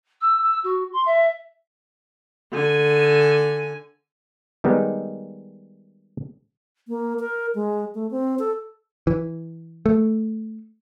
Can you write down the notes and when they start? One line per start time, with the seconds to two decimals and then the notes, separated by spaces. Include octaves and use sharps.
0.21 E6
0.42 E6
0.63 F#4
0.92 C6
1.05 E5
2.52 D3 G#5
4.64 D#3 G3 G#3 B3 D#4
6.88 A#3
7.20 A#4
7.55 G#3
7.95 A3
8.11 C4
8.39 A4
9.07 E3
9.86 A3